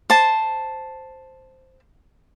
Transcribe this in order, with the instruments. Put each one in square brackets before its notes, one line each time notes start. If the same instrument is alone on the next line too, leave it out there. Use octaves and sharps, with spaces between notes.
[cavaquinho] C5 A5